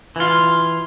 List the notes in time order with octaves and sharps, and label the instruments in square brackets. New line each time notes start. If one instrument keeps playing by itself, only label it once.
[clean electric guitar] E3 F4